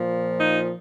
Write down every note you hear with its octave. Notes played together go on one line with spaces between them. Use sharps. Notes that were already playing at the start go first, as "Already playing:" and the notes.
Already playing: A#2 F3
D#4